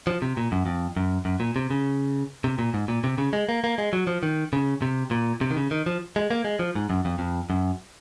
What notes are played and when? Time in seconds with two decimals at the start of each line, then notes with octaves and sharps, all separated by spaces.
0.07 F3
0.22 C3
0.37 A#2
0.52 F#2
0.66 F2
0.97 F#2
1.25 F#2
1.40 A#2
1.56 C3
1.70 C#3
2.44 C3
2.59 A#2
2.74 G#2
2.88 A#2
3.04 C3
3.18 C#3
3.33 G#3
3.49 A#3
3.64 A#3
3.78 G#3
3.93 F#3
4.07 F3
4.23 D#3
4.53 C#3
4.82 C3
5.11 A#2
5.41 C3
5.51 D#3
5.57 C#3
5.71 D#3
5.86 F3
6.16 G#3
6.31 A#3
6.45 G#3
6.59 F3
6.75 G#2
6.90 F#2
7.05 F2
7.19 F2
7.50 F#2